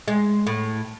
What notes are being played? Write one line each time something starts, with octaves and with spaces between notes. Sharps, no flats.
G#3
A2